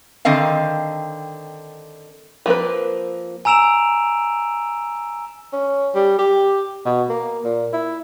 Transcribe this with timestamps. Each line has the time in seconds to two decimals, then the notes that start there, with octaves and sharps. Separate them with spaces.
0.25 D3 D#3 C4 D#5 F5
2.46 F3 A#3 C4 B4
3.45 G#5 A#5 E6 D7 E7 F7
5.53 C#4
5.95 G3
6.19 G4
6.86 B2
7.09 A#3
7.44 A#2
7.73 E4